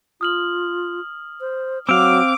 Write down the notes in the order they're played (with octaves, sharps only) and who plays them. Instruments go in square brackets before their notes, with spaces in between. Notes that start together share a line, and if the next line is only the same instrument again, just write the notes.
[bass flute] F4 [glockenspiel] D#6 F6 F#7
[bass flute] C5
[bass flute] F#3 [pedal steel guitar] C4 F5 [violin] D6 [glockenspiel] E6 D7